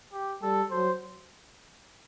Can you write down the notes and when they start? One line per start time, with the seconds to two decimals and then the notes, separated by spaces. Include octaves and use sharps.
0.13 G4
0.42 G3 A4
0.71 F#3 C5